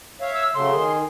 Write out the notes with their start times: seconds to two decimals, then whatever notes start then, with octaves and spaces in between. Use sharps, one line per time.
0.21 C#5 E5 F5
0.34 E6
0.54 C#3 F#3 A3 C6
0.72 D#3 G#4